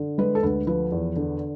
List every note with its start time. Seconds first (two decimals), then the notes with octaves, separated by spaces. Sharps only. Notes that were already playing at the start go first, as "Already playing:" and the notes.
Already playing: D3
0.18 G#3 B4
0.35 A4
0.43 D2 B4
0.67 F3 B4
0.92 E2
1.16 D3